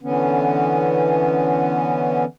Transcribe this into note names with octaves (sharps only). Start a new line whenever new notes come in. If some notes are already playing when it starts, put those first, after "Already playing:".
D3 E3 B3 C#4